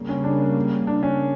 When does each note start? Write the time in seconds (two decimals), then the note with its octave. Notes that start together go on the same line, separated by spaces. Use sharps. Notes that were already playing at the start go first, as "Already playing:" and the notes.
Already playing: C#3 G3 A#3
0.09 C#4
0.24 D4
0.87 D4
1.03 C#4